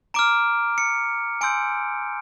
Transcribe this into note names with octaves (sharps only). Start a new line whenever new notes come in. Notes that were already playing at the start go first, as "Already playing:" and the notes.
A#5 D6 F6 D7
C#7
G#5 C6 E6 G6 D7